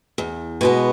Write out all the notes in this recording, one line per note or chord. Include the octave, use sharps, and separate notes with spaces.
E2
B2 G#3 B3